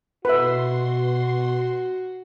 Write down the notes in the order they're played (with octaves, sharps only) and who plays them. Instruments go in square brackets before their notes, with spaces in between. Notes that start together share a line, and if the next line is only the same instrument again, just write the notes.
[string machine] B2 C6 [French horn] F#4 [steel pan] B4 E5